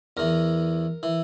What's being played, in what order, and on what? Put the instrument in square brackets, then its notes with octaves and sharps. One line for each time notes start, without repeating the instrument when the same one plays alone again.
[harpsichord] E2 E3 A#4
E3